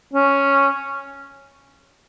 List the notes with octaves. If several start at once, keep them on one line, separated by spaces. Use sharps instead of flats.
C#4